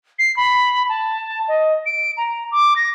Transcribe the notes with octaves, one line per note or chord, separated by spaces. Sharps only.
C7
B5
A5
D#5
D7
A#5
D6
A#6